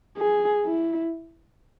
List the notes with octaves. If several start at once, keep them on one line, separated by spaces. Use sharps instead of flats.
G#4
E4